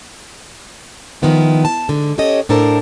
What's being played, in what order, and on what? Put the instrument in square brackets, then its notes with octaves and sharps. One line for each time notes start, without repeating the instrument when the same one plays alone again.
[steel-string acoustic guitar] D#3 F3 B3 E4
A5
G#2 D3
C#4 G4 A4 C#5 D#5
A2 D4 A4 A#4 C5 A5